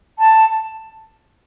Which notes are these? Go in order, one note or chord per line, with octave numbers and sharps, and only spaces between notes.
A5